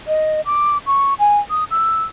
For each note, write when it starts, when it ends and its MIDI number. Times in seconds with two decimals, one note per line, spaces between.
0.08 0.41 75
0.46 0.78 86
0.87 1.14 85
1.19 1.40 80
1.50 1.64 87
1.71 2.04 88